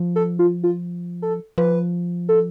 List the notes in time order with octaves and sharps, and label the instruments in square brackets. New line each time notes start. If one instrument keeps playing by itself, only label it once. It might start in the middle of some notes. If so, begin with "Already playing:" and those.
Already playing: [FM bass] F3
[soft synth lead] A4
F4
F4
A4
[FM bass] F3 [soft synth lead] B4
[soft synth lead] A4